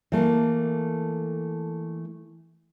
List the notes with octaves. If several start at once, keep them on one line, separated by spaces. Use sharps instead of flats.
E3 A3 A#3